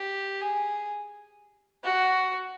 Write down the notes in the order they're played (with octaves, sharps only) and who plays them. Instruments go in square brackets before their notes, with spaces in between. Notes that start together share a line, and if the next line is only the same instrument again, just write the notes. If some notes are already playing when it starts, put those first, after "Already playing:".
Already playing: [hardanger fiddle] G4
G#4
F#4